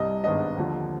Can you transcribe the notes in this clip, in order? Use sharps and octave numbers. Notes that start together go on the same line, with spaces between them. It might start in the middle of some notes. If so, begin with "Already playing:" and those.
Already playing: C2 C3 G3 D#5
G#1 G#2 D#3 B3 D4 D#5
D#2 D3 F3